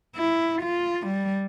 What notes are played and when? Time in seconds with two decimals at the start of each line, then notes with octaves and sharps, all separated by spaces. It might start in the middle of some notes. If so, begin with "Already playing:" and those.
0.16 E4
0.62 F4
1.07 G3